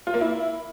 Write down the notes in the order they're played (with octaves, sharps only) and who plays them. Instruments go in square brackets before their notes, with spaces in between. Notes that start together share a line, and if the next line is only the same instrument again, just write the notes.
[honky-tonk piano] F4
A#3
E4